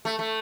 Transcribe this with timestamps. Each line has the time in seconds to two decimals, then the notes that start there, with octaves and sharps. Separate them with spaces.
0.05 A3
0.19 A3